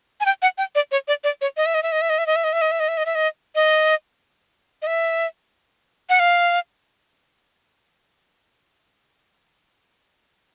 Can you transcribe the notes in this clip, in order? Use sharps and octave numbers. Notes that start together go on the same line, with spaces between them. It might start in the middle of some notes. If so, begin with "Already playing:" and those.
G#5
G5
F#5
G5
D5
C#5
D5
D5
C#5
D#5
E5
D#5
E5
D#5
E5
D#5
E5
D#5
E5
D#5
E5
D#5
E5
D#5
E5
D#5
E5
D#5
D#5
D#5
E5
F#5
F5